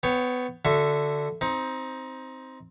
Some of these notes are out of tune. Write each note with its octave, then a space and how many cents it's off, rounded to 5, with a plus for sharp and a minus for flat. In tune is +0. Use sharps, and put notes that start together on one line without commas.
B3 +20 C#5 +0 G5 +5
D3 +0 F#4 -20 E5 +15
C4 +0 D#4 +20